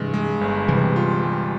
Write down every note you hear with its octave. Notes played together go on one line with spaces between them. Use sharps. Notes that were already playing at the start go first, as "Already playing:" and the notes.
Already playing: G2 C3 E3 G#3
G#3
G1
C3 E3 G3
F4
G3